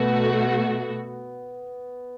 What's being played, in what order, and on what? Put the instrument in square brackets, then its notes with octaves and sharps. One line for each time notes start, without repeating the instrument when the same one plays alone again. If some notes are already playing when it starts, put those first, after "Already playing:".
Already playing: [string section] B2 A3 F#4 [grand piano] B3